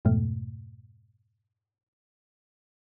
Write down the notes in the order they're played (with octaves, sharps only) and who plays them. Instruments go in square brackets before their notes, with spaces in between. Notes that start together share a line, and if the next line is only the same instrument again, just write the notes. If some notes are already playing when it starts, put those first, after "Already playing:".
[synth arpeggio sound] F2 G#2 B2 A3